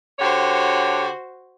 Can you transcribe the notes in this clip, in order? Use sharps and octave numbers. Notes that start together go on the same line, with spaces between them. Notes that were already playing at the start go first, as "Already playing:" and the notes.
D3 F#4 G4 C5 C#5